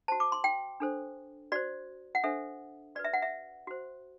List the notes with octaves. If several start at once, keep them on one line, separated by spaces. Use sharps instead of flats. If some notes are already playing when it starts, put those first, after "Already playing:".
F#4 C5 A5
D6
C6
G5
D4 A4 C5
F#4 C5 D5
F#5
D4 A4 C5 E5
F#4 B4 D5
E5
F#5
E5
F#4 C5